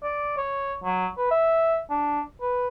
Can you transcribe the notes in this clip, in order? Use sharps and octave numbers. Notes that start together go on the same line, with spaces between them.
D5
C#5
F#3
B4
E5
D4
B4